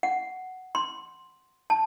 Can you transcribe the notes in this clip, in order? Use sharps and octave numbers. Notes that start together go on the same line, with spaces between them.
F#5
C6
A5